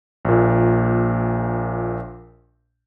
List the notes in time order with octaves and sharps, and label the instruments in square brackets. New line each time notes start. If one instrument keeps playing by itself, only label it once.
[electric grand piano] A#1 A#2